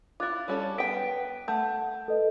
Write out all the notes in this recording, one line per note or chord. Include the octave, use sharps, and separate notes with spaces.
E4 F4 D6 F#6 A6
G3 C#4 A4
B3 G5 B6 D7
A3 F#5 G6
A4 B4 D#5